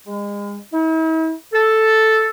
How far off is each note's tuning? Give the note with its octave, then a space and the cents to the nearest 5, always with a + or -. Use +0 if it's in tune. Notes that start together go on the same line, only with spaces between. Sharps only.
G#3 -35
E4 -45
A4 +0